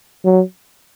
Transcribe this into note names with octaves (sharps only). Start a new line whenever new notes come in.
F#3